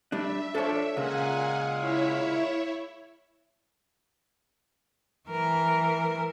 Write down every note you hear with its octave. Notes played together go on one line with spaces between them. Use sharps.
G3 D4 E5
F3 D4 A4 C#5
A#2 C#3 G#3 F5 F#5 G#5
E4 C#5 E5
E3 A#4